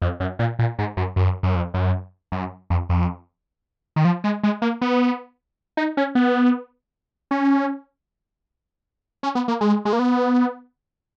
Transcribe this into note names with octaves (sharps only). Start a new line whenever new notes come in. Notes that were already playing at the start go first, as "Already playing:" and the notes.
F2
F#2
A#2
A#2
G#2
F#2
F#2
F#2
F2
F#2
F#2
F2
F2
D#3
F3
G#3
G#3
A#3
B3
D#4
C#4
B3
C#4
C#4
B3
A#3
G#3
G#3
A#3
B3